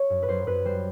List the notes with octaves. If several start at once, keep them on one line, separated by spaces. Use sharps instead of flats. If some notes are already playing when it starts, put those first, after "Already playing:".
Already playing: C#5
F#2
B4
F#2 C5
F#2 B4
G3 C5